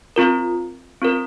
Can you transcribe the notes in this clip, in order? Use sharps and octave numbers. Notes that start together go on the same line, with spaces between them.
C4 F4 A#4
C4 F4 A#4